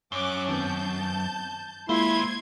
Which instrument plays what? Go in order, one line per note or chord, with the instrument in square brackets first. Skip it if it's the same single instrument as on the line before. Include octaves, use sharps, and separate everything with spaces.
[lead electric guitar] F#2 [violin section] C#4 D6 F#6
[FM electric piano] D#3 B3 C4 [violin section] A5 G6
[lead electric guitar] D#3 C5 [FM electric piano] G#3 A#3 F4 [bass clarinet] E4 [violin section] C6 G#6